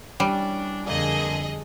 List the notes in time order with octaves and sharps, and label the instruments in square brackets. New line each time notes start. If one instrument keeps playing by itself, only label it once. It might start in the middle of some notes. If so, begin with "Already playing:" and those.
[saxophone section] E3 C#4 D4 [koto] G3
[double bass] F2 D3 [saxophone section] A#2 [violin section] G#4 A4 D#5